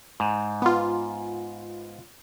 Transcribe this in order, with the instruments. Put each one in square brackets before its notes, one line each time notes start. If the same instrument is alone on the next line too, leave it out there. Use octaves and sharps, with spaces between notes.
[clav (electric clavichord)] G#2
[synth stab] B3 F4